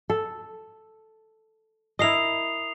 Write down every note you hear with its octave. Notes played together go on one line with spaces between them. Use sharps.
A4
E4 A#4 D#5 D#6 C7 F7